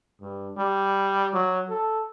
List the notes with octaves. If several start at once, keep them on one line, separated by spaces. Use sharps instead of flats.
G2
G3
F#3
A4